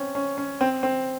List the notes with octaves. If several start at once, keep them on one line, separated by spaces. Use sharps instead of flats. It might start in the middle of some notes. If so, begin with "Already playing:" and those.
Already playing: C4 C#4
C#4
C#4
C4
C4